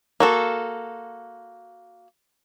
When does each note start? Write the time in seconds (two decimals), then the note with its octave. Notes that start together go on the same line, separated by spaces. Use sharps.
0.20 A#3 F#4 A4